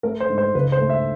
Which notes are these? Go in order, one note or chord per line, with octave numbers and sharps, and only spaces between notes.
A3 A#4
C5
G#2
C5
C#2 B4
C5
A3
E5